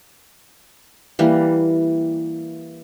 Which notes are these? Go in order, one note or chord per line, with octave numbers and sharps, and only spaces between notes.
E3 G3 A#3